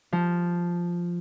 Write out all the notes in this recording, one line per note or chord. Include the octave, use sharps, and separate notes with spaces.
F3